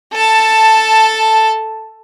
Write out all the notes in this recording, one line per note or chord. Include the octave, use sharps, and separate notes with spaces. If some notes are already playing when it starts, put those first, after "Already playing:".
A4 A5